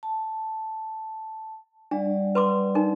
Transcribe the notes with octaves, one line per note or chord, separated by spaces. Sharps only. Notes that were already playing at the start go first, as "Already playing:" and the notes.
A5
G3 D4 D5 F#5
B4 C6 D6
D4 D#4 A#4